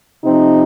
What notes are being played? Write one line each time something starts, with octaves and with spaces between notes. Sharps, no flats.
C3 F3 C4 D#4